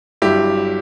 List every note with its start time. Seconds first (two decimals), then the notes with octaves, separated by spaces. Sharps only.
0.22 G1 G2 F#3 E4 G4